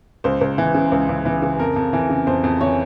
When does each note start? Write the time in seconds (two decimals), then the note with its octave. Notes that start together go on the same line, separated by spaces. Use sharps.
0.24 C#2 C5
0.41 C#2
0.58 E3
0.74 C#3
0.92 C#2
1.09 C#2
1.25 E3
1.42 C#3
1.59 F2 A#4
1.76 F2
1.93 E3
2.10 C#3
2.27 F2 C5
2.44 F2
2.61 E3 C#4 C#5